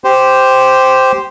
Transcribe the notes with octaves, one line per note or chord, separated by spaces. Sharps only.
G4 C5